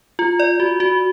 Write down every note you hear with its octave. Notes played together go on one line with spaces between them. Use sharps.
F4
D5
F#4
F#4